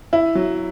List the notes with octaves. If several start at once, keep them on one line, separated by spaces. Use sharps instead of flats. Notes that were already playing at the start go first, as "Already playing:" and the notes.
E4
F#3